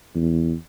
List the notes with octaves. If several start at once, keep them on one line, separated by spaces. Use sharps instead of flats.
E2